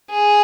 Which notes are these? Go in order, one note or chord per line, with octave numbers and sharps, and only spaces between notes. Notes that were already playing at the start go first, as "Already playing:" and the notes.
G#4